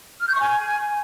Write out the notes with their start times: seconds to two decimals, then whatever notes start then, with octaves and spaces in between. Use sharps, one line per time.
0.22 F6
0.28 G6
0.34 C#6
0.40 G#5